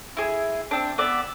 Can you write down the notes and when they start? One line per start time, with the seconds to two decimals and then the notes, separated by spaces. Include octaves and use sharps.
0.17 E4 G#4
0.71 C4 D4
0.98 B3 D5 E5